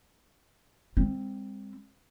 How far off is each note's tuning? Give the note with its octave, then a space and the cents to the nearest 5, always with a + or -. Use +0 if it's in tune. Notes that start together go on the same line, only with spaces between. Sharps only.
G#3 -45 C4 +0